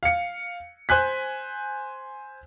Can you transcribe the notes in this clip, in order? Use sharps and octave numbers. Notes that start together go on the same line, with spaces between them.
F5 C#7
C5 G#5 F#6 B6